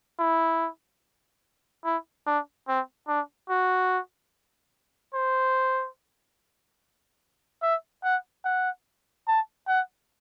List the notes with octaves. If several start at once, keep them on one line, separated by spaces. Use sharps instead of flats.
E4
E4
D4
C4
D4
F#4
C5
E5
F#5
F#5
A5
F#5